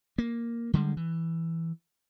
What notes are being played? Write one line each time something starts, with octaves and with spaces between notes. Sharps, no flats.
A#3
D3 G3 G#3
E3